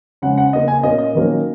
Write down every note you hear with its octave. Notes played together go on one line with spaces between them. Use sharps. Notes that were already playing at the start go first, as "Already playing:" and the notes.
C#3 G#3 C#4 F#5
F#5
C#3 A#3 C#4 D#5
G#5
A#2 A#3 C#4 D#5
D#5
D#3 F#3 A#3 C#4